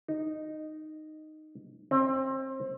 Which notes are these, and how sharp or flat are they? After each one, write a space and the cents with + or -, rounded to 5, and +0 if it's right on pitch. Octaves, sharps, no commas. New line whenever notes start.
D#4 -10
C4 +25